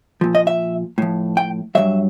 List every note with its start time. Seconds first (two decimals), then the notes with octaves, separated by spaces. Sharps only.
0.21 A#2 F3
0.35 D#5
0.47 E5
0.98 A2 F3
1.37 G5
1.75 G2 D#3 F#3 E5